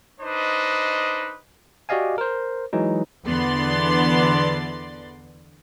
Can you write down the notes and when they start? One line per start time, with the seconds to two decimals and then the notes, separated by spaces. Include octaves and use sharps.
0.20 D4 D#4 B4 C5 D#5
1.89 F#4 G4 D5 D#5 F5 G#5
2.18 A#4 C5
2.73 E3 F#3 G#3 D#4
3.26 E2 D3 B3 D5 C6